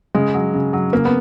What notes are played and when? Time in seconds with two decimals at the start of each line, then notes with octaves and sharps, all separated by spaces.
0.15 C#3 G#3
0.34 F#3
0.53 C#3
0.73 F#3
0.92 C#3 A#3
1.05 B3